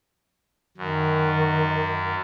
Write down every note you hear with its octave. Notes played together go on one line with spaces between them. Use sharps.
F#2 D#3